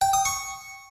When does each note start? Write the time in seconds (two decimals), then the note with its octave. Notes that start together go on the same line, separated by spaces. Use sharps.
0.01 G5
0.13 D#6
0.25 C#6